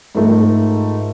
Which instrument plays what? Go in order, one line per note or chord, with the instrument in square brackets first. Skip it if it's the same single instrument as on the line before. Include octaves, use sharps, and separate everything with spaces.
[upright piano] G#2 F3 A3 [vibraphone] A#4